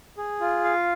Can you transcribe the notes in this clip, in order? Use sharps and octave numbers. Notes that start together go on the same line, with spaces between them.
G#4
F4
F5